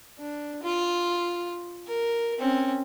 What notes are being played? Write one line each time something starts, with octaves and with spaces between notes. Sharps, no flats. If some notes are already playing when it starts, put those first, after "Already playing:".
D4
F4
A#4
C4 C#4